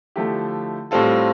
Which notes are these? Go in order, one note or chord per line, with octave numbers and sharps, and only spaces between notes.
D3 F3 A3 E4 G4
A2 G3 C4 F4 A4